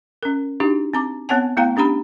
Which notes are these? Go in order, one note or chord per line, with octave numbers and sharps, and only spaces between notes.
C#4 A#4
D4 D#4 F#4 G4
C4 A#5 D6
B3 C4 C#5 F#5 G#5 A5
A3 B3 E4 F5 G5 A#5
C#4 D4 G4 A#5 B5